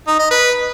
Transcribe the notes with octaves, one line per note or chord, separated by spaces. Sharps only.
D#4
D#5
B4